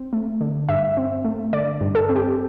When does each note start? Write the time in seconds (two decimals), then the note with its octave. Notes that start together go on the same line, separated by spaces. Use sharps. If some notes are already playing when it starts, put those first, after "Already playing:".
Already playing: C4
0.13 A3
0.41 D3
0.69 G2 E5
0.97 C4
1.25 A3
1.53 D3 D5
1.81 G2
1.95 A4
2.09 C4
2.16 G4